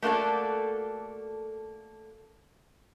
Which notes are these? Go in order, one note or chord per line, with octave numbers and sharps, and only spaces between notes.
A3 A#3 F#4 A4 D5